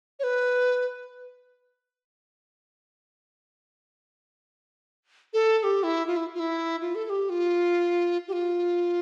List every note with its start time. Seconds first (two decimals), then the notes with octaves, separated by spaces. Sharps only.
0.20 C#5
0.24 B4
5.33 A4
5.59 A4
5.64 G4
5.83 E4
6.07 F4
6.17 E4
6.34 F4
6.39 E4
6.81 F4
6.95 A4
7.05 A4
7.10 G4
7.30 F4
8.28 G4
8.33 F4